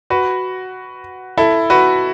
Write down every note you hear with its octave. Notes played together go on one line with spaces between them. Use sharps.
F#4 B4
E4 A4
F#4 B4